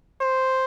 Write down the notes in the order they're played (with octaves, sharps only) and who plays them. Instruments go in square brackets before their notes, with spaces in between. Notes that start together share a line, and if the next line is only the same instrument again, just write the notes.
[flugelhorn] C5